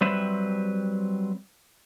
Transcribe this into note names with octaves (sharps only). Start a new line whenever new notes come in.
F#3 G3 C4 B4 C5 E5